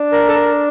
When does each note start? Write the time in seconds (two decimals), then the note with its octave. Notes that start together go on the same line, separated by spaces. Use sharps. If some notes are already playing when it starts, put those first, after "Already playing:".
Already playing: D4
0.12 A#4
0.28 A4
0.35 A#4